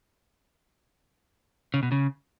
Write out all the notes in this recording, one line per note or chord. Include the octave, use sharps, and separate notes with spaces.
C#3
B2
C#3